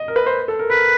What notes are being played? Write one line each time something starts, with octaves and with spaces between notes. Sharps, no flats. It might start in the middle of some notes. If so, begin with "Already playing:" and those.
Already playing: D#5
A#4
B4
C5
A4
A#4
A#4 B4